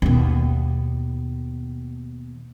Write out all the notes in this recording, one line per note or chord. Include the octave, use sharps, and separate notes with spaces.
D#2 B2